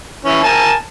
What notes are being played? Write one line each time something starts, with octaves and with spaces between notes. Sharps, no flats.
E3 C#4
A#4 G#5 A5